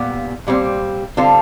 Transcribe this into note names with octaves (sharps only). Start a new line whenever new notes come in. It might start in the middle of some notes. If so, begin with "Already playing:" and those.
Already playing: A#2 G3 B3
A#2 G3 C4
D3 G3 C4 F4 A4